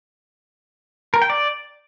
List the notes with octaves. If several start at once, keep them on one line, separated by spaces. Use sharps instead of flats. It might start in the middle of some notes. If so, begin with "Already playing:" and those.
A#4
G5
D5